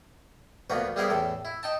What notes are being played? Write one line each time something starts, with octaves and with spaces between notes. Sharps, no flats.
D2 F3 A#3 B3 F#4 B4
G3 B3 E4 G#4 A#4 C5
E2 A2 A4
E4
D#4 G5 A5